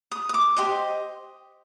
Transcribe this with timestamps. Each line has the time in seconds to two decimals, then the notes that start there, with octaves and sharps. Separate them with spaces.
0.11 D#6
0.29 D#6
0.34 D6
0.56 G4 C5 D#5